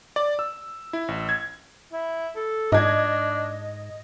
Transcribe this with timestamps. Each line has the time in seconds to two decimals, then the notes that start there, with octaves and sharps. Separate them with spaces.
0.16 D5
0.39 E6
0.93 E4
1.08 A1
1.29 G#6
1.92 E4
2.36 A4
2.72 G#2 D4 D#5 G#6